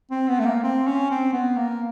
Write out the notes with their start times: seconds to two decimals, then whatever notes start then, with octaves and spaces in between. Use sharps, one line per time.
0.11 C4
0.29 B3
0.40 A3
0.46 A#3
0.64 C4
0.87 C#4
1.11 C4
1.33 B3
1.57 A#3